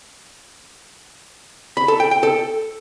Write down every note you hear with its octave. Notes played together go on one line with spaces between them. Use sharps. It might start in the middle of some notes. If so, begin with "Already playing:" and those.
B5
A4
G5
G5
A4